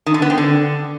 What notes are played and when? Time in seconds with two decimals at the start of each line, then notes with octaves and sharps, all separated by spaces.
0.06 D#3
0.14 D3
0.22 B3
0.30 C4
0.38 D3